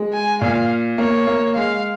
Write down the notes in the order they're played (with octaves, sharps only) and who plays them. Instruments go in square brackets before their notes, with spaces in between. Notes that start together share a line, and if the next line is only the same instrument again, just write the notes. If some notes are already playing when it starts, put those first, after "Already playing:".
Already playing: [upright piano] G#3
[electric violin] G#5
[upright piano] A#2 [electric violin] F5
[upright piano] A#3 [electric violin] C#5
[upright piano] A#3
[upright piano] G#3 [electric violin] F5